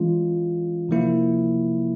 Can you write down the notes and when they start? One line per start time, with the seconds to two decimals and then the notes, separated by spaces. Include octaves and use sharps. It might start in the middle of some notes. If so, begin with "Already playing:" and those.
Already playing: E3 G#3 C#4 F4
0.89 C3 F3 A#3 E4